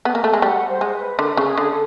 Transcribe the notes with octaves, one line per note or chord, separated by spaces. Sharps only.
B3
A#3
A3
G#3
G3 F#5
C5
G#3
B4
D3 A#4
C#3
G#4
D3
A4